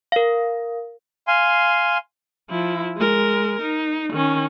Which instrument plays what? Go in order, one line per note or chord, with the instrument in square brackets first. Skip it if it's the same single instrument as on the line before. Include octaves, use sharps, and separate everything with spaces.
[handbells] A#4 F5
[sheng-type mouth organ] F5 G#5 C6
[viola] F3 E4
G#3 A#4
D#4
D#3 C#4